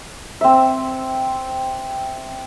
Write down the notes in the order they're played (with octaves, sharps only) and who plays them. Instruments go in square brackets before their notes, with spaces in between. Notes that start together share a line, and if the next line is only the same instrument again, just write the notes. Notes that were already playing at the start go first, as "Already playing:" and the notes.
[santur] C4 E5